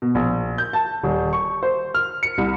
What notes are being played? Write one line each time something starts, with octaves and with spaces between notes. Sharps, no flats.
B2
A#1
G6
A5
D#1
C#6
C5
F6
C#7
C2